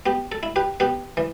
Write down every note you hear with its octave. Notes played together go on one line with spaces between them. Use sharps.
B3 G4
A4
E4
G4 B4
B3 G4 B4
E3